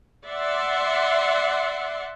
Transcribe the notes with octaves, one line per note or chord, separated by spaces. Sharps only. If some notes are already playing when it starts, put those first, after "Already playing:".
D5 E5 F#5 C6